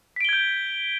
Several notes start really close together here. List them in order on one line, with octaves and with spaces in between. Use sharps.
B6 D7 G7 G#6 G6